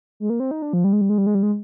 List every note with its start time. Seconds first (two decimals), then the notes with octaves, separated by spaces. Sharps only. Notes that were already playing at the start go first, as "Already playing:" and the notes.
0.20 G#3
0.30 A#3
0.40 C4
0.51 D#4
0.62 D4
0.73 F3
0.84 G3
0.93 G#3
1.01 G3
1.09 G#3
1.18 G3
1.27 G#3
1.35 G3
1.43 G#3